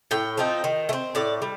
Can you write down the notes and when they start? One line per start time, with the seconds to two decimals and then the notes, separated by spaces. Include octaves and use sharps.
0.11 A2 G5
0.38 F3 C4 D#4
0.64 D#3
0.89 A3
0.93 C4
1.15 A2 D5
1.42 G3